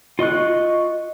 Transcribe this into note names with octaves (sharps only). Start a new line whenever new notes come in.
F4 D#5 C#6 F#6